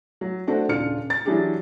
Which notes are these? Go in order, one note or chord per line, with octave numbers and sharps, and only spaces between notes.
F#3
A3 C4 D4 F#4
D#1 C#3 D4 F4 F6 C#7
A6
E3 F#3 D4 E4 G4 G#4